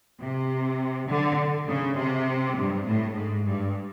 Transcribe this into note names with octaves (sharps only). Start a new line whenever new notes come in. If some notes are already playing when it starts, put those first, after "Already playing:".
C3
D3
C#3
C3
G2
A2
G#2
G2